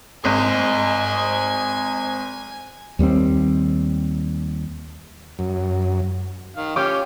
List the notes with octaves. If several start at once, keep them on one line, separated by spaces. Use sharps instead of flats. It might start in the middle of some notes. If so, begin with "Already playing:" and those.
G#1 C5 D#5 G#5
D#2 G3 A#3 C4
F#2
D#3 F5
C#4 F4 G4 D6 G6